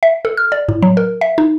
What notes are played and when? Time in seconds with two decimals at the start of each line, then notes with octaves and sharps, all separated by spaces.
0.03 E5
0.25 A4
0.37 F6
0.52 D5
0.69 A2
0.83 F#3
0.97 A#4
1.21 E5
1.38 D#4